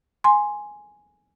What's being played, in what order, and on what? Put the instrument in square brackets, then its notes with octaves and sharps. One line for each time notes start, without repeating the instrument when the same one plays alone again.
[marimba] G#5 C6